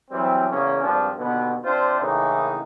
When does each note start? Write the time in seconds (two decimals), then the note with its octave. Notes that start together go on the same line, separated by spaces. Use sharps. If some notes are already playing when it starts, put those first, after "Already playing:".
0.11 E3 F#3 G3 C4
0.50 E2 C#3 A#3 C#4
0.82 G#1 G2 F3 C4 D4
1.18 D#2 B2 D3 B3
1.64 C3 D4 F4 C5
2.00 A2 C#3 E3 A#3 D#4